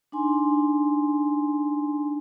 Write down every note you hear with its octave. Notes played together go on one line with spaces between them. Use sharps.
D4 D#4 G#5 C6